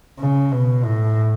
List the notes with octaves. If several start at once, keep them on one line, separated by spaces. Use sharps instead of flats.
C#3
B2
A2